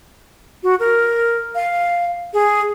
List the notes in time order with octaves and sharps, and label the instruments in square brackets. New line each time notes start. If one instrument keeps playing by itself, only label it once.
[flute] F#4
A#4
F5
G#4